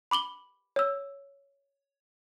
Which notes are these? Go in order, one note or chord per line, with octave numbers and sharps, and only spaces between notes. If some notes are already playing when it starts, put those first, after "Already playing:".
B5 D6 F#7 G7
C#5 E6